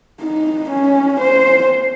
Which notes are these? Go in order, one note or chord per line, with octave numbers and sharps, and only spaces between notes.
D#4
C#4
C5